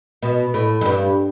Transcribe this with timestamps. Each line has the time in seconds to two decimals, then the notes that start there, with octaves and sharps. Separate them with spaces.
0.22 B2
0.54 A2
0.81 F#2
0.86 G2